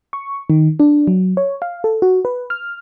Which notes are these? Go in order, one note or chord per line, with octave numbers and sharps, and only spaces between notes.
C#6
D#3
D4
F#3
C#5
F5
A4
F#4
B4
F6